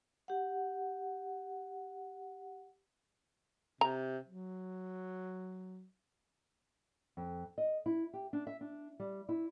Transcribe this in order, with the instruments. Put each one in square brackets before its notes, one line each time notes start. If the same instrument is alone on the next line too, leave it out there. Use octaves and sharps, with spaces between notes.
[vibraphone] G4 F#5
[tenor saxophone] C3 [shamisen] A#5
[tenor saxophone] F#3
[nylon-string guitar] F2
D#5
E4
G4
D4
E5
D4
G3
E4